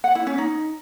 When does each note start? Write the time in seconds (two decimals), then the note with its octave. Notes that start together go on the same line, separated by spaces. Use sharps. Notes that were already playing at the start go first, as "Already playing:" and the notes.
0.04 F#5
0.15 E4
0.27 C#4
0.38 D#4